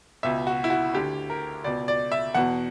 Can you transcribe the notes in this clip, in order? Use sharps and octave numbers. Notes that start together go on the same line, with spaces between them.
C#2 B2 E5
F#4
E4
F#4
D2 D3 G4
A#4
C#2 B2 D5
D5
E5
E2 B2 F#5